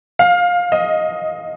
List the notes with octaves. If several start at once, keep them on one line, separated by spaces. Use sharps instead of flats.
F5
D#5